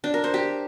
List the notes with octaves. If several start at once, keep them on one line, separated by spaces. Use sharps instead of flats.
D4
A#4
C5
G4